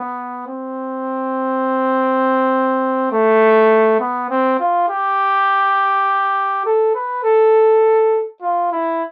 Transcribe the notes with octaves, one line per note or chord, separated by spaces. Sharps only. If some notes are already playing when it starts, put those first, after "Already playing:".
Already playing: B3
C4
A3
B3
C4
F4
G4
A4
B4
A4
F4
E4